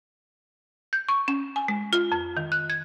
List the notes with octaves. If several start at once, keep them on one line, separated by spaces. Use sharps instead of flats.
G6
C#6
C#4
G#5
G#3
F4
F2
D#3
F#6
G#6